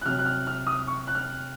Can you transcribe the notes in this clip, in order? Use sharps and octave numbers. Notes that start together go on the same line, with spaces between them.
F#6
C3 F#3 F6
F#6
F6
F6
D#6
C#6
F#6
F6